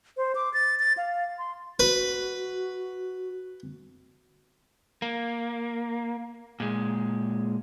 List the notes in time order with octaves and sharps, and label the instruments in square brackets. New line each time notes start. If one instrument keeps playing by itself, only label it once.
[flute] C5
D6
A6
A6
F5
C6
[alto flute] F#4 [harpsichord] B4
[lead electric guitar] A#3
A#2 G#3